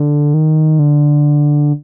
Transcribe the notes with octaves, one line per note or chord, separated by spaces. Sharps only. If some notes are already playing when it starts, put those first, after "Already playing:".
Already playing: D3
D#3
D3